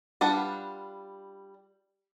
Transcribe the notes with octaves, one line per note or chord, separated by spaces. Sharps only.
G3 D4 F4 B4 F#5